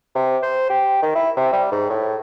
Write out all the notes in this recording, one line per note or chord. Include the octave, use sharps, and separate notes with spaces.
C3
C5
G4
D#3
E4
C3
G3
G#2
A2